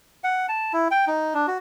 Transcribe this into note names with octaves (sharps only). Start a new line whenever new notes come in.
F#5
A5
E4
G5
D#4
D4
F#4